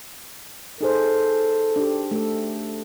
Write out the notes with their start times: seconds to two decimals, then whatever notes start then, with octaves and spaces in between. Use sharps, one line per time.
0.81 D#4 G#4 A4 C5
1.76 D4 G4
2.11 A3 A4